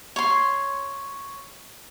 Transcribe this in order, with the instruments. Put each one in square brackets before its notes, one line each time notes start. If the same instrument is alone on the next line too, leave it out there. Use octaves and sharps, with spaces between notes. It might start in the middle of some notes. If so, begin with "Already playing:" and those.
[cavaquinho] C#5 C6